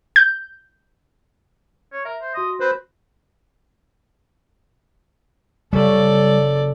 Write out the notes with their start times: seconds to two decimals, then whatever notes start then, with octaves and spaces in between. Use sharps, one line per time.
0.16 G6
1.93 C#5
2.05 A#4 E5
2.21 C5
2.34 F#4 D#5 C6 A#6
2.60 C4 B4 C5
5.73 F#1 C#3 G3 A4 D5